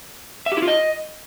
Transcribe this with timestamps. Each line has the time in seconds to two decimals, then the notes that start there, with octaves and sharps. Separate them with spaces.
0.46 E5
0.52 G4
0.57 E4
0.62 F4
0.68 D#5